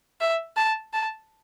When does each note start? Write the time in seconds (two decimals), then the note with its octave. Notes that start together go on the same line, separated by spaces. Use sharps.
0.20 E5
0.56 A5
0.93 A5